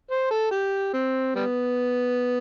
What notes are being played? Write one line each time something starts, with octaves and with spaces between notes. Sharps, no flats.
C5
A4
G4
C4
G3 B3